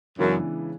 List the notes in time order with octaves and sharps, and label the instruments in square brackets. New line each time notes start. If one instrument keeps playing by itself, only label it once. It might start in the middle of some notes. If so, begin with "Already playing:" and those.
[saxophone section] F#2 [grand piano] C#3 E3 G#3 B3 D4